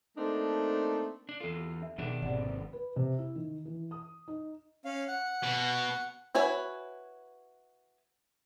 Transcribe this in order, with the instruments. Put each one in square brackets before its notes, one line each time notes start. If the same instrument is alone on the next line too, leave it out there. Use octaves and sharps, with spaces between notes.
[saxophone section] A3 A#3 C4 D4 D#4
[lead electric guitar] D4
[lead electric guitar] E2 F4 [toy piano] A4
[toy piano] G4
D4 E5
[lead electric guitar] B2 D4 [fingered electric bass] D#3 F3 [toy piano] G#4
[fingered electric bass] G#1 C3 [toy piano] D5 F#5
[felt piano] B4
C3
E4
D#3
E3
D#6
D#4
[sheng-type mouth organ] C#4 F5
F#5
[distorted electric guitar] B2
[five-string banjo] E4 F#4 B4 C#5 G#5